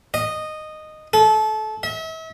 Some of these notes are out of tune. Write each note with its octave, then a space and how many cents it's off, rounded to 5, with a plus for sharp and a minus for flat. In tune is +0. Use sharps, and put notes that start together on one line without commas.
D#5 -10
A4 -25
E5 -40